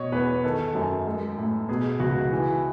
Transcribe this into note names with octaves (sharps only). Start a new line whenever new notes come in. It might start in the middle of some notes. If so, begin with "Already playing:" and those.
Already playing: B2 C#5 D#5
E2 B4
D#3 A4
F#2
G#3
A2
B2 G#4
C#2 F#4
E3